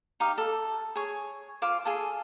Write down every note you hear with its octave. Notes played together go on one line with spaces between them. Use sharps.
D#4 G4 F5
A4
G#4 C#5
F4 C5 F5 D6
F4 G#4 A4